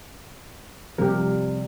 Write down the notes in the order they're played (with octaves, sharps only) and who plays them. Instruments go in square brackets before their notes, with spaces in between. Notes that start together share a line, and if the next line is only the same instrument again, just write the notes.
[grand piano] C3 [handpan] F3 G3 [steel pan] G4 A#4